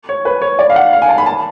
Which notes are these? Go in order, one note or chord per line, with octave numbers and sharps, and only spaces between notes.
C#5
B4
C#5
D5
F5
F#5
F5
G#5
A5
B5
A5